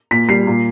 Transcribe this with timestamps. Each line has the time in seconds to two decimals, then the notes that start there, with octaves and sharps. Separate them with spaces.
0.11 A#2 B6
0.29 G3 C7
0.47 A#2